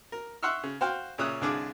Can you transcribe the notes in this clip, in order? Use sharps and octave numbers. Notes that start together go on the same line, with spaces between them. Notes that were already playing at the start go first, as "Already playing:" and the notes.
A#4
E5 F#5 C6 C#6 E6 F6
C#3
F#4 C5 F5 G5
A#2 C#3 C#5 E5 D#6 F#6
C2 D3 D4 G#4 F5 D6